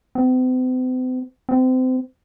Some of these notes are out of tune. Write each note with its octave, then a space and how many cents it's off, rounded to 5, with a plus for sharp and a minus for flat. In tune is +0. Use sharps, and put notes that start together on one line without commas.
C4 -45
C4 -30